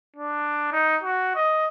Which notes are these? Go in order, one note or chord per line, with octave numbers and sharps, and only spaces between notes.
D4
D#4
F#4
D#5